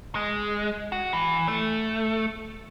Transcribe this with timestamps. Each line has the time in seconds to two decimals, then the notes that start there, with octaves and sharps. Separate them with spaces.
0.15 G#3
0.92 F#4
1.13 E3
1.48 A3